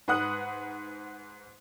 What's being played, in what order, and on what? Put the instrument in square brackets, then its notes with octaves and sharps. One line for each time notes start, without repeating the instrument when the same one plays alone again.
[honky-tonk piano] G#2 B4 F#5 D#6 F#6